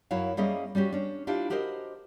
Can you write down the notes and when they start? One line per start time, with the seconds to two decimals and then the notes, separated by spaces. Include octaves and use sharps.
0.11 F#2 F#3 E4 F#4 C#5 F5
0.37 G3 A#3 C#4 G#4 D#5 E5
0.75 G3 C#4 F#4 G4
0.92 C#4 D4
1.27 D4 E4 F4 G4
1.50 F#4 G4 A#4 C5 D5 D#5